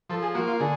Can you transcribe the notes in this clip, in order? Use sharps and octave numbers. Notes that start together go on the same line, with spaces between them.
F3 A4
G#4
A#3 F#4
F4
D3 G#4